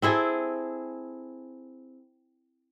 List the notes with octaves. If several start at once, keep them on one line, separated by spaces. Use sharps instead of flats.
C4 E4 G#4 A4